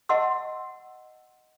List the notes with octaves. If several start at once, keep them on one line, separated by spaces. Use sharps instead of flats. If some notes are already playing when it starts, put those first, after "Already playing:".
D#5 F#5 A5 C6 E6